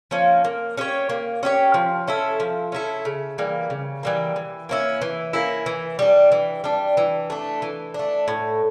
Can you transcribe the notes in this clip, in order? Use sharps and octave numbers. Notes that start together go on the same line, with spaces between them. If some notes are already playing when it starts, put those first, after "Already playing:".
F3 A#3 C#4
A#3
C#4 G4 C#5
A#3
C#4 G4 C#5
F3
C#4 E4 A4
F3
C#4 E4 A4
C#3
E3 G3 A#3
C#3
E3 G3 A#3
E3
A#3 C#4 E4
E3
A#3 C#4 E4
E3
G3 D4
E3
G3 D4
E3
A3 D4
E3
A3 D4
A2